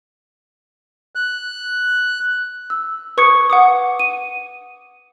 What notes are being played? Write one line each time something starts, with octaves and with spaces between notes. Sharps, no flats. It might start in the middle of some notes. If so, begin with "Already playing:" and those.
F#6
E6
B4 C#6 D#6 G#6 C#7
F#5 D6 D#6
D#7